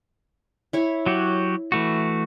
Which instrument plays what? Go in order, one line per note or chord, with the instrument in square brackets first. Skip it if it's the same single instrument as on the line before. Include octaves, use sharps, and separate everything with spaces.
[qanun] E4 C#5
[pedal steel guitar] F#3 F#4 G4
E3 A3 F#4